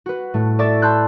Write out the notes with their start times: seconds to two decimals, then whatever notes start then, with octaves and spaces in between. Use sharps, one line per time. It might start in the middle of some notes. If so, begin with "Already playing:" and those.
0.06 F#4 B4
0.34 A2 A3
0.59 A4 D5 E5 C#6 A6
0.82 A5 B5 C6 E6 F#6 G6